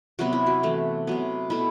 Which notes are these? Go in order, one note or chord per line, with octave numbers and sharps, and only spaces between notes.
C3 F#3 B3 F#4
E4
F#4
E3 A3
C3 F#3 B3
B2 A3 E4